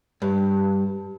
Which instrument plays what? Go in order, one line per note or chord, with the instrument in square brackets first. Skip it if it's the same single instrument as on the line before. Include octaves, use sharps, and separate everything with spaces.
[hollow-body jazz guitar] G2